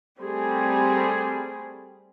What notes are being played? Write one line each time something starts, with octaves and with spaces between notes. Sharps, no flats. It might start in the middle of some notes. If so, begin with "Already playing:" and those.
G3 A3 C4 G#4